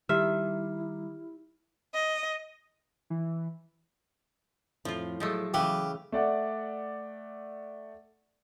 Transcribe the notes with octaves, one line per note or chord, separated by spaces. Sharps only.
D#3 G3 E4 G4 E5 F6
D#5
E3
F2 A2 F3 F4
F3 F#3 G#3 A3
C#3 E3 G4 B4 F5
A3 D5 F#5